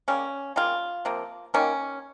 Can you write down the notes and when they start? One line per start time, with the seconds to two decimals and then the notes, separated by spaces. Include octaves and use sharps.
0.08 C#3 G3 A#3 C#4
0.56 C#3 G3 A#3 F4
1.05 C3 F3 A#3
1.54 D#3 G3 A#3 C#4